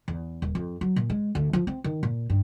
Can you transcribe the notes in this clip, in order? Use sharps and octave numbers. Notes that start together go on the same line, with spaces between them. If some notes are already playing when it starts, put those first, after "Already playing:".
E2
D#1
F2
F#3
A#2
G#3
D2
F3
C4
D#3
A#2
G2